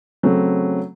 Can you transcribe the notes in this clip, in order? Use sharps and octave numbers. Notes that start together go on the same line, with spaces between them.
C#3 F#3 A3 C4